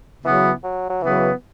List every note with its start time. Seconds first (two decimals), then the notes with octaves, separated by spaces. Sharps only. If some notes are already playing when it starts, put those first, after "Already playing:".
0.24 C#3 E3 F#3 B3
0.64 F#3
0.89 F#3
1.02 C#3 E3 F#3 B3